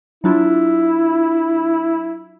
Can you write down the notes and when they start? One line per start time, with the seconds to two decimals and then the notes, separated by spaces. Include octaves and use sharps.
0.24 F#3 D4 E4 F4